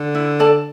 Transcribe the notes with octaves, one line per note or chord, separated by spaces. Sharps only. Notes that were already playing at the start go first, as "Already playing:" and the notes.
Already playing: D3
E4
A4 D5 A5